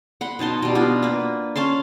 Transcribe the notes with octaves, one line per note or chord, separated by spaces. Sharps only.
F#5 B5 C6
B2 D#4 A5 C6
B2 G3
B3 D4 F4
A#3 B4
C#4 F5 A5 C6